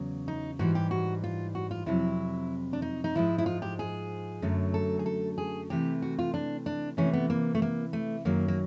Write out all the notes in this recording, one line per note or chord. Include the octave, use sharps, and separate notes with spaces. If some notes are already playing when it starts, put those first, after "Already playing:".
Already playing: E2 C#3 F#3
D#4
G#2 E3 G3 F#4
G4
F#4
F4
F#4
F4
F2 C3 D#3 F#3 E4
D4
D#4
D#4
G#2 F3 G#3 E4
E4
F4
G4
G#4
F#2 D3 F#3 A3
A4
G#4
A4
G#4
C3 E3 A3 G4
F#4
F4
D4
D4
C3 E3 A3 C#4
B3
A#3
A3
A#3
A3
F#2 D#3 F#3 A#3
A#3